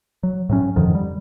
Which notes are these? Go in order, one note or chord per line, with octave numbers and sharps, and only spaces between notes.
F#3
A2 F#3 C#4
F2 D3 D#3 F3
G3